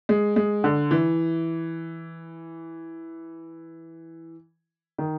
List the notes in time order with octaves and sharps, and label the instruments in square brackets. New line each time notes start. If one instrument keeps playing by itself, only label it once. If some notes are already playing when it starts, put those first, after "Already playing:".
[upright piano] G#3
G#3
D3
E3
D#3